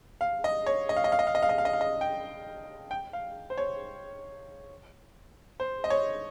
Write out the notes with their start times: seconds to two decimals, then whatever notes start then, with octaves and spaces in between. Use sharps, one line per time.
0.21 F5
0.44 D#5
0.66 C#5
0.89 D#5
0.96 F5
1.04 D#5
1.12 F5
1.19 D#5
1.27 F5
1.35 D#5
1.42 F5
1.49 D#5
1.58 F5
1.65 D#5
1.73 F5
1.81 D#5
2.01 G5
2.91 G5
3.13 F5
3.50 C5
3.58 C#5
5.60 C5
5.84 D#5
5.90 C#5